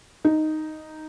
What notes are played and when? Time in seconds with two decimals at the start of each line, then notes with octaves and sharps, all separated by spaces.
0.25 D#4